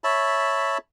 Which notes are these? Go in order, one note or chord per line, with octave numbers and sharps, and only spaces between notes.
C#5 E5 A5 B5